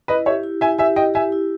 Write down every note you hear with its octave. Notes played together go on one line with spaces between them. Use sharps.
E4 B4 D#5
G4 C#5 E5
E4
E4 E5 G#5
G4 E5 G#5
G4 D#5 G5
G4 E5 G#5
E4